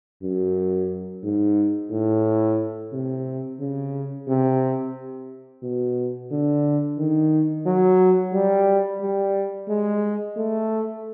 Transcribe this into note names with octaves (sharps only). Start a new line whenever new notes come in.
F#2
G#2
A2
C3
C#3
C3
B2
D3
D#3
F#3
G3
G3
G#3
A3